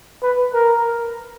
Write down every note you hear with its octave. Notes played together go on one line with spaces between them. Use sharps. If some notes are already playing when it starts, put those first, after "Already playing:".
B4
A#4